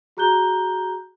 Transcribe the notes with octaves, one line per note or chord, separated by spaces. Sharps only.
F#4 G#4 A#5 F#6 G6 G7